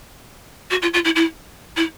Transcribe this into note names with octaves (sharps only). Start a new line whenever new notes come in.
F#4
F4
F4
E4
E4
E4